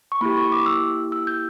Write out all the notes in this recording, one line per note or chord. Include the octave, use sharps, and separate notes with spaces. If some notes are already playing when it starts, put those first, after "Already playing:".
C#6
A#3 E4 G4 B5
C#6
D6
E6
E6
G6